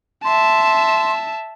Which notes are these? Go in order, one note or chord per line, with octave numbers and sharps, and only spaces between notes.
E5 A5 C6